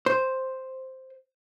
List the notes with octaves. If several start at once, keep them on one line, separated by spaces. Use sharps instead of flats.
C5